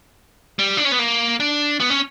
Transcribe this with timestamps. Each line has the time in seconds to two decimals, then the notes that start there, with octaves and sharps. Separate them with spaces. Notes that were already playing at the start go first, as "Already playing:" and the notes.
0.59 G3
0.77 D4
0.85 C#4
0.92 B3
0.99 A#3
1.40 D4
1.80 B3
1.90 C#4